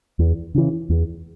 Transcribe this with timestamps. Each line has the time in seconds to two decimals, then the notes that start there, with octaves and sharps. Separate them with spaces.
0.19 E2
0.55 C#3 E3
0.90 E2